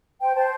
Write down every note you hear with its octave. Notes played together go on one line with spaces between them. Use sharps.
C5 G5
C5 A5